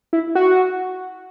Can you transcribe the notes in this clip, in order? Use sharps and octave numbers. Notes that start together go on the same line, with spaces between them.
E4
F#4